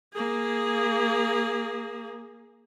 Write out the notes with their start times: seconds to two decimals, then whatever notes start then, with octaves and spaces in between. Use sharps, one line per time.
0.14 A#3 G#4